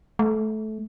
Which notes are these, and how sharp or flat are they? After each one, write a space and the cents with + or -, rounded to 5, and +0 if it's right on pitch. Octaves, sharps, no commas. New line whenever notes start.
A3 -20